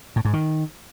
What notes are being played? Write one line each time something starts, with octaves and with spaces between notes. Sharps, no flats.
A2
G#2
D#3